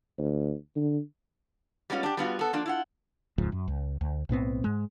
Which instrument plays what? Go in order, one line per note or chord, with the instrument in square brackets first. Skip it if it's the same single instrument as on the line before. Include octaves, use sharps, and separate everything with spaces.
[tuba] D2
D3
[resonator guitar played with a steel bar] G3 G#3 B3 C#4 F4
D4 G4
G3 B3 F4 F#4
B3 A4
F3 A#3 D4
E4 F4 F#5
[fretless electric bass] E1 C#2 G#2 F3
F#2
C#2
D2
B1 A2 B3 C4
G#2 G#3